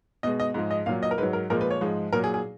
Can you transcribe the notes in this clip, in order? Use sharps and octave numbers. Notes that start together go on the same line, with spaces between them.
B2 G#3 D#5
D#5
G#2 F3 G#3
D#5
A#2 F#3 F5
D#5
A#4
G#2 F#3 B4
A#4
A#2 F3 G#3 A#4
B4
C#5
G#2 F3 G#3
A#2 F#3 A#4
G#4
G#4